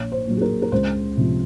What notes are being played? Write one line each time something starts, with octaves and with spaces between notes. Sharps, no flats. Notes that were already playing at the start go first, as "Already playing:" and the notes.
Already playing: A#1 C#5
C5
A#2 F#3
G#4
A#4
A#4
C#2 C5
C3 F3